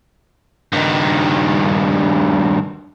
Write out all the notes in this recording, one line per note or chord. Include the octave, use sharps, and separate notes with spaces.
G2 D#3